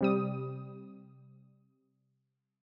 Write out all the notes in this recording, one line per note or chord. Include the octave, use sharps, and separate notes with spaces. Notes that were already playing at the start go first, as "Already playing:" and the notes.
C3 G3 D#6